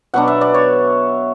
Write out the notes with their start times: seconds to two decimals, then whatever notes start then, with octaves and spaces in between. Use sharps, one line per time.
0.14 B2 F#3 B3 D4 F#5
0.28 E5
0.41 D5
0.54 C#5